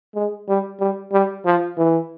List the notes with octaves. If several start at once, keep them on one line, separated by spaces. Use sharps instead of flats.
G#3
G3
G3
G3
F3
E3